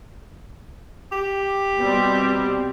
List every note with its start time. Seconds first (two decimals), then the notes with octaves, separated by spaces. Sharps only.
1.12 G4
1.78 B2 G3 C4